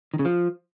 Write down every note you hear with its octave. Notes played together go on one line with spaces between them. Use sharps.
D#3
C#3
F3